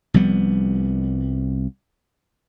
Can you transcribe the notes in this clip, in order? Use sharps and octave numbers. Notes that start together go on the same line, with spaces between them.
C2 F3 G3 B3